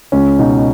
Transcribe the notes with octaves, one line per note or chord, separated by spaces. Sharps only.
C#2 C#4
B2 D#4